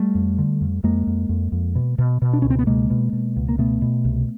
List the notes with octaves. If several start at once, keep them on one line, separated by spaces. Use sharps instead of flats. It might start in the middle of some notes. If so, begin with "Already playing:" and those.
Already playing: G3 A3
F2
D3
F2
F2 G#3 A#3
F2
F2
F2
B2
B2
B2
D4
C#2 C#4
C4
B3
B2 G#3 A#3
B2
B2
C#2
A#3
B2 A3 B3
B2
C2